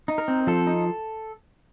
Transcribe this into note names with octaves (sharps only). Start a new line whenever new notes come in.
D#4
A#4
C4
F3 A4
D#4